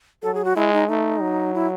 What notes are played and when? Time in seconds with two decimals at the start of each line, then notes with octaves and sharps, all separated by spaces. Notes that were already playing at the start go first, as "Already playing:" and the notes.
0.23 F#3 A4
0.35 G#4
0.45 F#4
0.56 G#3 E4
0.73 D#4
0.88 A3 D#4
1.21 F#3
1.54 E4